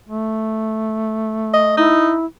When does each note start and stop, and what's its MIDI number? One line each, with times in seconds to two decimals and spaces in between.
0.09 1.96 57
1.54 1.75 75
1.77 2.17 63
1.77 2.25 64